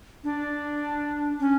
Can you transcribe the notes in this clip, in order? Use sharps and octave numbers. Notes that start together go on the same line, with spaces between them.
D4
C#4